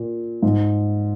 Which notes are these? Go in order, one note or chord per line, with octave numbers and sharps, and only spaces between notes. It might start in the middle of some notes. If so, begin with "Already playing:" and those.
Already playing: A#2
G#2